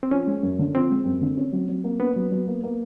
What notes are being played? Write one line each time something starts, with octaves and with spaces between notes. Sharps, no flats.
C4
F3 C#4
G#3
F#2
D3
F3 C4
G#3
F#2
D3
C#4
F#3
F#3
A#3
B3 C#4
F#3
F#3
A#3
A#3